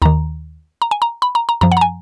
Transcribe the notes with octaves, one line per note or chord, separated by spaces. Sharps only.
D#2 D#3 A#5
A#5
G#5
A#5
B5
A#5
A#5
F#2 F3 A#5
F#5
A#5
G#5